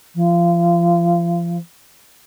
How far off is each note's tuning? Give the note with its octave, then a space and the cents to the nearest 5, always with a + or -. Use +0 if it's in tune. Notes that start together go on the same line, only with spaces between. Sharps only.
F3 -30